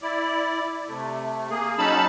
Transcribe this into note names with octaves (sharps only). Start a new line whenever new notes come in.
E4 D5
C3 A3
A#3 G#4
F#3 C#4 D#4 A5 B5 E6